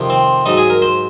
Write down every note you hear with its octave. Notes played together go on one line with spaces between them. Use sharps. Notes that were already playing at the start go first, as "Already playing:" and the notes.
Already playing: F2 C3 D#3
C4
G#2 F#3 D#4
G#4
A#4
C5